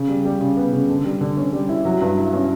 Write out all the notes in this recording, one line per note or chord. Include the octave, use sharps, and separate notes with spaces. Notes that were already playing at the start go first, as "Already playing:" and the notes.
Already playing: C#3
G3
G3
C#3
B3
C#3
D3
G3
D3
C#4
G3
E4
F#3
G2
E4
C#4